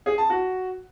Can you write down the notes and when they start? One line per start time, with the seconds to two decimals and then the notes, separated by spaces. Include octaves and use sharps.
0.06 G#4
0.18 A5
0.30 F#4